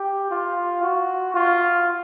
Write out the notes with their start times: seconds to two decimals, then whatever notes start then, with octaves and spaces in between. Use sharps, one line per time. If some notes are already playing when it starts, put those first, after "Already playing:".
Already playing: G4
0.31 F4
0.83 F#4
1.34 F4